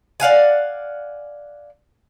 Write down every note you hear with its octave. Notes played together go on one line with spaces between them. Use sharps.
D5 F5 F#5 G#5